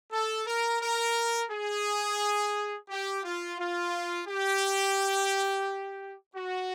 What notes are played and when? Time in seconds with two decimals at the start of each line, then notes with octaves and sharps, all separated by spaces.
0.12 A4
0.46 A#4
0.81 A#4
1.51 G#4
2.89 G4
3.24 F4
3.59 F4
4.27 G4
6.35 F#4